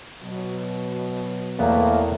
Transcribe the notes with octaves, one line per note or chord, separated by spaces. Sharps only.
B2 F#3
E2 A2 A#3 B3